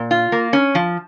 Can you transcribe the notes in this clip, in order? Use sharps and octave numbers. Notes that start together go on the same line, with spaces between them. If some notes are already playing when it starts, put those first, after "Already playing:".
Already playing: A#2
F4
A#3
C#4
F3